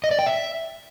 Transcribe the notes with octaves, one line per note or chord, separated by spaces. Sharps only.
D#5
D5
G5
E5